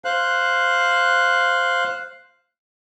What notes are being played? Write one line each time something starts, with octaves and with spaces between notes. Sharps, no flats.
C5 F5 F#6